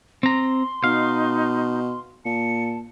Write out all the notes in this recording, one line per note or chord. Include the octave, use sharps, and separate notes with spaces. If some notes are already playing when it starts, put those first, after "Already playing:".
C4 A#5 C6
B2 D#4 F5
A#2 A5 C#7